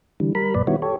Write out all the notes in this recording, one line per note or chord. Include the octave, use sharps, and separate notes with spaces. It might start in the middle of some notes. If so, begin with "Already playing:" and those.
D3 E3 G3
G3 A#4 B5
F#2 A#2 B4 D5
D#3 G3 B3 E4 F#4 C#5
G4 A4 C#5